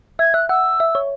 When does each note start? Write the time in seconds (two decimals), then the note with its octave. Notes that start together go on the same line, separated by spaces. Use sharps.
0.19 E5 G#6
0.34 E5 F#6
0.49 F#5 E6
0.80 E5
0.95 C#5